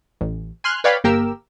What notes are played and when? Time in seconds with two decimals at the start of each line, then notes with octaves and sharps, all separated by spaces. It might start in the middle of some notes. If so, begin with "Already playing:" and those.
0.21 A1
0.64 G#5 C6 F6 F#6
0.84 B4 C#5 D5 F5 G5 B5
1.04 G1 A#3 G4 A#4 E6